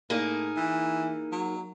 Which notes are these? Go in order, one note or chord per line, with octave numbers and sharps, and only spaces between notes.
A2 A#3 D#4 G#4
E3
F#3